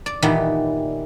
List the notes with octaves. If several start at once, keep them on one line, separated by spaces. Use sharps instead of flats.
D5
A#2 D#3 E3 G3 B3